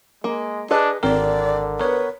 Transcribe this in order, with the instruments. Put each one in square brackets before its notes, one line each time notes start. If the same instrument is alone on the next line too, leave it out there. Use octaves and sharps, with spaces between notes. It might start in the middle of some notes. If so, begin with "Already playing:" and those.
[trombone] G#3 [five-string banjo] A#3
[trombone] D4 [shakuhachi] G#4 [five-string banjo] A4 B4 D#5
[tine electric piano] G#1 A#4 [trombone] D3 [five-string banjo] C4 [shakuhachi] D5
[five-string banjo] B3 [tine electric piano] A#4 C#5 [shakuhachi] B4